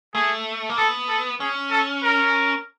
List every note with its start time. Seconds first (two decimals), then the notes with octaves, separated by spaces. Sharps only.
0.15 A3 G#4
0.69 A#3
0.78 B3 A4
1.09 A4
1.40 C#4 G#4
1.71 A4
2.03 A#4